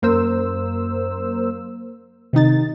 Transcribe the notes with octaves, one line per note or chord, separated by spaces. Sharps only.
F#2 A#3 A#4 C5 E6
C3 D#3 D#4 A6